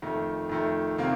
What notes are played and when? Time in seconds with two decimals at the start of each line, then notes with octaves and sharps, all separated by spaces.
0.02 F2 D#3 A3
0.49 F2 D#3 A3
0.98 C3 D#3 A#3 F4